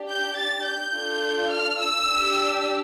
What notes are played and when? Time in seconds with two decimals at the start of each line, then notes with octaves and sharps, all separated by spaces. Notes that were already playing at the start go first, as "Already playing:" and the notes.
Already playing: D4 G4
0.09 G6
0.38 A6
0.65 G6
0.94 D4 F4 A4
1.50 F6
1.79 E6
2.08 D4 G4